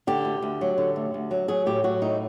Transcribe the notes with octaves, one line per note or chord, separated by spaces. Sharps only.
D3 G4
D2
D2
F#3
D3
D2
D2
F#3
F#3 G#4
A2 G4
F#3 F#4
A2 D#4